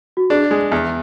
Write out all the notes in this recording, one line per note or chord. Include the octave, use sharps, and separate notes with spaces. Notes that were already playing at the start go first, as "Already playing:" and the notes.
F#4
D4 G#4
G#3
E2 G#4